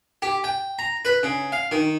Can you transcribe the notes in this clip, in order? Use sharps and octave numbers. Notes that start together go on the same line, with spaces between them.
G4
G5
A#5
B4
C#3
F5
D#3